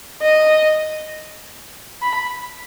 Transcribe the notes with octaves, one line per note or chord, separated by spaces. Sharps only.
D#5
B5